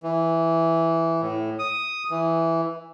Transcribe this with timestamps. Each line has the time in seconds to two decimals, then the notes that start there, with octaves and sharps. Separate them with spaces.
0.03 E3
1.22 A2
1.59 D#6
2.10 E3